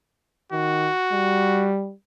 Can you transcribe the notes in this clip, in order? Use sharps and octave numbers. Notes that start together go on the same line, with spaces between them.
D#3 F#4
G3